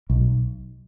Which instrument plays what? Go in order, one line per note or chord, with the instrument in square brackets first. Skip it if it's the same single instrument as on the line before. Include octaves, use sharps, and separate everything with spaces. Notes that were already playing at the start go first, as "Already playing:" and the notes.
[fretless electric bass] B1